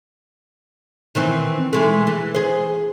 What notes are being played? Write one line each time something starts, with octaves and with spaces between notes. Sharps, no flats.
D#3 E3 C4
E3 G#3 A3
E3
G#4 C5